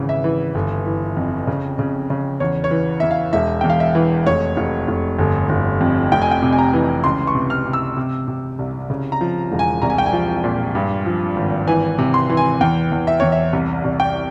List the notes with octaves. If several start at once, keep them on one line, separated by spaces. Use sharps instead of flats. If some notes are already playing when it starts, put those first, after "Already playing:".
Already playing: G#1 C#3 E3
E5
E3
G1
E3
F2
C#3
C#3
C#3
E2 C#5
C#5
E3
E2 E5
F5
E1 E5
E2 G5
F5
E5
E3
F1 C#5
F1
F1
G1
G1
F2
F1 G5
G#5
G5
C3
G#5
A#5
E3
C#2 C6
C#6
C3
F6
C3
E6
C3
C3
C2
C#3
A#5
F3
E1
G#5
C2 A#5
G#5
G5
G#5
F3
A#2
G2
F3
G#1
E3 G#5
C3
C6
E3
G#5
E2 G5
E2
E5
E2 C#5
E5
C2
C2
G5